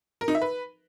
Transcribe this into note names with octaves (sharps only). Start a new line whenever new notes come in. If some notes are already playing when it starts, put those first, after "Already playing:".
A#4
D#4
E5
B4